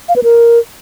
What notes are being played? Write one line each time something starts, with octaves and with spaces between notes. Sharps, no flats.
F5
B4
A#4